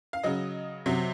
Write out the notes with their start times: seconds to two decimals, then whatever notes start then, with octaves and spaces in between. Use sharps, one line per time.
0.13 F5
0.24 C#3 F#3 D#5
0.86 C3 F#3